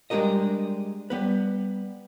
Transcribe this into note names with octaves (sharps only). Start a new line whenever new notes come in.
G3 G#3 D4 G4 A#4 D#5
G3 B3 B4